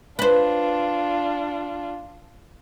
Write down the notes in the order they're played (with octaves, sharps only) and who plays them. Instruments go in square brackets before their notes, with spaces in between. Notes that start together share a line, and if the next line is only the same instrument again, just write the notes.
[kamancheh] D4 F4 [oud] B4 C5